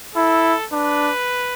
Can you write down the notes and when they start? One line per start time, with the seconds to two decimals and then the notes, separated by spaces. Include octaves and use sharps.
0.15 E4 A4
0.71 D4 B4